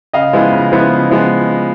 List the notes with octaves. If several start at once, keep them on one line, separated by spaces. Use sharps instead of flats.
C#3 D#5 F5
F3 G#3 B3 E4
C#3
F3 G#3 B3 E4
C#3
F3 G#3 B3 E4